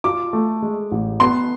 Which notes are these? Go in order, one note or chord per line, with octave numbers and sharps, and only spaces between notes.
F4 D6
A3
G#3
A1
B3 C6